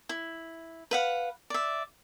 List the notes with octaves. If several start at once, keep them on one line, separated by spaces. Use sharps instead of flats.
E4
B4 F5 F#5
D5 E5